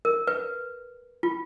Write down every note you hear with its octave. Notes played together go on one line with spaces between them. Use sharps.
A#4
B4
F4